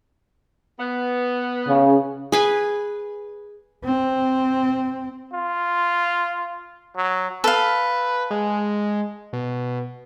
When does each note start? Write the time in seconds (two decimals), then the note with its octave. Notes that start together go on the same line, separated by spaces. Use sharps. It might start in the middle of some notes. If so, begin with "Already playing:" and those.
0.80 B3
1.67 C#3
2.32 G#4 B4 G#5
3.84 C4
5.33 F4
6.96 F#3
7.44 A4 B4 F5
8.31 G#3
9.33 B2